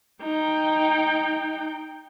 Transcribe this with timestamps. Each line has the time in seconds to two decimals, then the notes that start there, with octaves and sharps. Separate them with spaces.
0.23 D#4 G5